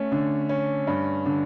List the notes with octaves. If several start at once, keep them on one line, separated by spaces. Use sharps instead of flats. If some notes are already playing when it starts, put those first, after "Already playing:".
Already playing: A3 C#4
D3
C#4
G2
D3